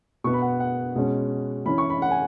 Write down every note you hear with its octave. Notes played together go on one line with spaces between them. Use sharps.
B2 B3 C#6
B5
F#5
F#5
B2 G#3 C#4
E3 C#4 B5
C#6
B5
F#5
G#5